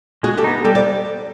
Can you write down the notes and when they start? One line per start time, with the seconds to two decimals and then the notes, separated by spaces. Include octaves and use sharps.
0.23 G#3 F#4 G#4
0.37 G4 A4
0.44 B3 D#4
0.64 G3 G4 A4
0.75 C5 D5